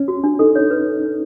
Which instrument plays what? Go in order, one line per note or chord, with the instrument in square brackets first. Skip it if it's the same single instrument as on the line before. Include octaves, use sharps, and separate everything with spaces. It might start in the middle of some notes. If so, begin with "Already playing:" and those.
Already playing: [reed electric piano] C#4
[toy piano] F#4
D4
[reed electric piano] D#4 [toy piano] A4
[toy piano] C#5
B4